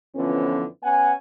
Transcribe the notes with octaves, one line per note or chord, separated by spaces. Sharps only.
F2 D3 E3 F3 B3 C#4
B3 C#4 F#5 G#5